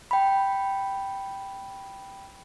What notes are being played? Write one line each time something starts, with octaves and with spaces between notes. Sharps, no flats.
G5 B5